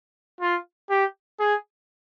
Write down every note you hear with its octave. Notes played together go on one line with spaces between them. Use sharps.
F4
G4
G#4